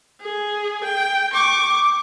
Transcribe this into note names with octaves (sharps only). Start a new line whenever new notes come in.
G#4
G5
C#6 D6